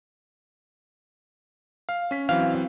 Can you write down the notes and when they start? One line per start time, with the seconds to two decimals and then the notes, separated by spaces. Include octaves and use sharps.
1.89 F5
2.11 C#4 B6
2.29 E3 F#3 C4 F5